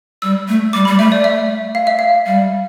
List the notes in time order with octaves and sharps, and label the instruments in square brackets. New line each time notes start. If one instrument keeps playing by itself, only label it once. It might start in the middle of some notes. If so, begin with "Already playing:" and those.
[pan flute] G3 [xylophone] E6
[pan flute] A3
[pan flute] G3 [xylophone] D6
[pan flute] G3 [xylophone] B5
[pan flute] A3 [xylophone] E5
[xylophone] D5
E5
F5
E5
F5
[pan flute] G3